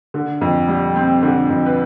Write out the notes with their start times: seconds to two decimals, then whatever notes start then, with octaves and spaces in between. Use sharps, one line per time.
0.14 D3
0.41 F2
0.68 G3
0.96 C4
1.23 D3
1.50 F2
1.66 B4